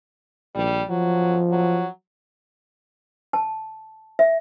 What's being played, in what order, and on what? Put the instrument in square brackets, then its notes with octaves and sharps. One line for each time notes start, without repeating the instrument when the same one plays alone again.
[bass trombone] A#1 [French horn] G3
[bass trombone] F3 [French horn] F#3
[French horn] F#3
[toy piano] A5
E5